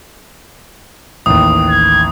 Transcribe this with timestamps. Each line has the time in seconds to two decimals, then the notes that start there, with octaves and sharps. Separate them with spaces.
1.26 A1 D#2 D#6
1.69 G#6